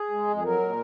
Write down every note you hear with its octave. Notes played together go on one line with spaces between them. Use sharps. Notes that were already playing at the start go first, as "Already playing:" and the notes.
Already playing: G#4
G#3
F2
G#4
F#3 A#4
A#2